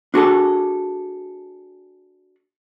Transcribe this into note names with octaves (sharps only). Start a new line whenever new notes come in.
D4 F#4 G#4 A4